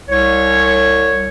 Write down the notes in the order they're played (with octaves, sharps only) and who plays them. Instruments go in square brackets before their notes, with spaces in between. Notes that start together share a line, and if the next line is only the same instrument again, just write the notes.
[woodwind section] C2 C#5